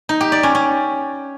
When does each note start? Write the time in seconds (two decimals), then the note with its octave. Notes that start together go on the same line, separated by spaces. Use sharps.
0.09 D#4
0.21 G4
0.32 D5
0.43 C#4
0.55 C#4